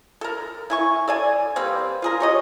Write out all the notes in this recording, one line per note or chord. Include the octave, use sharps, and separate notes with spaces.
A4 A#4
E4 G#5 C#6
A4 D5 G#5
G3 A#3 C4 B4
F4 G#4 A#4
G4 C#5 D#5